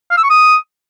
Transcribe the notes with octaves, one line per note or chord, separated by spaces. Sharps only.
F5
E6
C#6
D#6